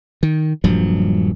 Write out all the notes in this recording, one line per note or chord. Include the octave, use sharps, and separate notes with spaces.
D#3
D#1 G2 F3 F#3